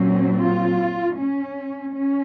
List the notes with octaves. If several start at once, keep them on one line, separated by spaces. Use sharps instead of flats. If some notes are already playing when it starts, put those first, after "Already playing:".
Already playing: A#2 F#3 C4 C#4
F4
C#4
C#4